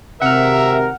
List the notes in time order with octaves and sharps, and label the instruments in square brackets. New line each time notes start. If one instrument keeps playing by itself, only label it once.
[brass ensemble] G#1 A#4 [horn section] C3 [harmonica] E5 [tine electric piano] F#5 F6